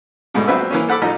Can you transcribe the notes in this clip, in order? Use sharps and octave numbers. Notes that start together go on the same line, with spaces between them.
D2 G#2 B2 A3
A#1 F#3 B3 C4 B4 E5
E3 A#3 C#4
A4 F#5 B5 D6 E6
A1 F3 D#4 A4 A#5